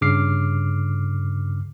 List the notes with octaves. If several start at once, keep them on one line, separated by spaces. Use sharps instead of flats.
G2 C#3 D6 F6 C7